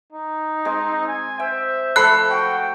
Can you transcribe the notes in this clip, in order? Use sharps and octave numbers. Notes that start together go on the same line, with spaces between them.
D#4
G#3 C4 G#4
G#5
C5 E5 G5
F3 A3 A4 B5 F#6 C7
F#4 G5